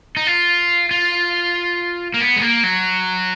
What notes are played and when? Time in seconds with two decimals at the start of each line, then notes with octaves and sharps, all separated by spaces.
0.17 D#4
0.27 F4
0.91 F4
2.14 A#3
2.20 B3
2.36 G#3
2.42 A#3
2.63 F#3